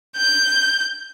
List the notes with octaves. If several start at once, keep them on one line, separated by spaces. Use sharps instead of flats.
G6